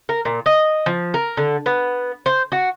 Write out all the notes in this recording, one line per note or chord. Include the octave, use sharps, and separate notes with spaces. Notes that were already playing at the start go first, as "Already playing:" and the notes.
A#4
A#2
D#5
F3
A#4
D3
B3
C5
F#4